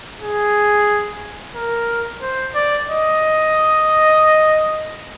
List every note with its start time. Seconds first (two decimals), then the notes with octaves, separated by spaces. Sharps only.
0.21 G#4
1.55 A#4
2.21 C5
2.55 D5
2.88 D#5